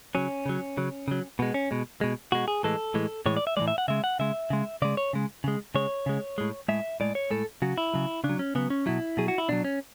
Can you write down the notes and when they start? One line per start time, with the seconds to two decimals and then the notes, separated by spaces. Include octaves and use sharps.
0.15 C#3 F#3 C#4
0.46 C#3 F#3
0.77 C#3 F#3
1.08 C#3 F#3
1.39 B2 G#3 B3
1.54 C#4
1.71 B2 G#3
2.01 B2 G#3
2.32 B2 G#3 F#4
2.48 G#4
2.63 A2 E3 G#3 A4
2.94 A2 E3 G#3
3.26 A2 E3 G#3 C#5
3.37 D5
3.47 E5
3.57 A2 E3 G#3 D5
3.68 E5
3.78 F#5
3.88 C#3 G#3 E5
4.04 F#5
4.19 C#3 G#3 E5
4.50 C#3 G#3
4.82 C#3 G#3 D5
4.97 C#5
5.13 C#3 G#3
5.44 C#3 G#3
5.74 C#3 G#3 C#5
6.06 C#3 G#3
6.38 A2 G#3
6.68 A2 G#3 E5
7.00 A2 G#3 D5
7.15 C#5
7.30 A2 G#3 A4
7.62 C#3 F#3 F#4
7.78 E4
7.94 C#3 F#3
8.24 C#3 D4
8.29 F#3
8.39 C#4
8.55 C#3 F#3 B3
8.70 C#4
8.86 B2 F#3 E4
9.17 B2 F#3 G#4
9.28 F#4
9.38 E4
9.49 B2 F#3 D4
9.64 C#4